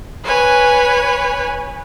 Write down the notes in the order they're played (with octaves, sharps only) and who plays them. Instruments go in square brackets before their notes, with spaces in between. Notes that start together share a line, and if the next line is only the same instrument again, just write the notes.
[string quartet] B4 C#5 G#5